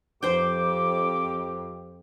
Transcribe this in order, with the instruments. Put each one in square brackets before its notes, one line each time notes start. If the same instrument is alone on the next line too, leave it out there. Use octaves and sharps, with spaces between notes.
[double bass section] F2 [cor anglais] G4 [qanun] C5 G5 [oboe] D6